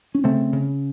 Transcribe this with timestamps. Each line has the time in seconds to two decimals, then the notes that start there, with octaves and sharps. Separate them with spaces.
0.15 C#4
0.24 C#3 A3 C4
0.53 C#3